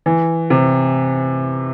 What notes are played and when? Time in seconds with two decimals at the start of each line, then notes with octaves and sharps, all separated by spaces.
0.06 E3
0.50 C3